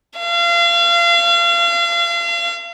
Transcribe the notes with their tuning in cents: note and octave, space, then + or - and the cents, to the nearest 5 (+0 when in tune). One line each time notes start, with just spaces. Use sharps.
F5 -35